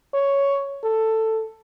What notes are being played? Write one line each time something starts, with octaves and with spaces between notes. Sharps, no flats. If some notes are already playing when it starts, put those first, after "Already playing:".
C#5
A4